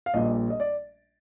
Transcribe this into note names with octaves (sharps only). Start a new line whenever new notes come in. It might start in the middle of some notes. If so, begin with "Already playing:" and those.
F5
A#1 A#2 G3 D#5
D#5
D5